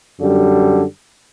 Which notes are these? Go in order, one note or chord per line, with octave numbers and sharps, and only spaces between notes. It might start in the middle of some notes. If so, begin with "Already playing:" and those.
F#2 D3 G3